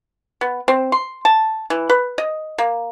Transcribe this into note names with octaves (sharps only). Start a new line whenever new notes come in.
B3
C4
C6
A5
E3
B4
D#5
A#3